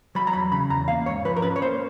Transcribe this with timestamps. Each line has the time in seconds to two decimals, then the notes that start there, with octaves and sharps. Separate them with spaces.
0.15 F#3 B5
0.27 A#5
0.33 E2 B5
0.52 C#3 B5
0.70 E2 A#5
0.88 A#3 F5
1.06 G#2 C#5
1.25 F3 B4
1.36 A#4
1.42 C#4 B4
1.56 C#5
1.62 A#3 C5